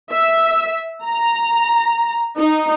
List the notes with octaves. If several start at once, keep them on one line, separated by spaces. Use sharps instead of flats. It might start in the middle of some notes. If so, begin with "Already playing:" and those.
E5
A#5
D#4